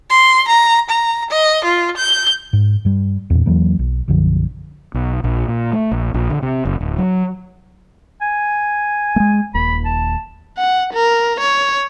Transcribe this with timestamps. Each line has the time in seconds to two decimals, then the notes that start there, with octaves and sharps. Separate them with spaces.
0.10 C6
0.48 A#5
0.90 A#5
1.31 D#5
1.64 F4
1.97 G6
2.53 G#2
2.85 G2 G3
3.30 E2 A#2
3.46 E2 E3 F#3 A#3
3.79 B1
4.08 B1 F#2 D3 F3
4.94 B1
5.24 A#1
5.48 A#2
5.73 A3
5.91 A#1
6.14 A#1
6.30 D3
6.42 C3
6.65 F#1
6.81 D1
6.98 F#3
8.21 G#5
9.16 G#3 A3
9.54 D#1 D#2 B5
9.85 A5
10.58 F#5
10.93 A#4
11.40 C#5